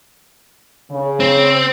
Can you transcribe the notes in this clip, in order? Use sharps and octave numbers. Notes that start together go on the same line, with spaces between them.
C#3
C4